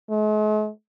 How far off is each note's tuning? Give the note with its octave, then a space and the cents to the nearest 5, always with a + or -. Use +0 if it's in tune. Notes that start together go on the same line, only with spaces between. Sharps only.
G#3 +45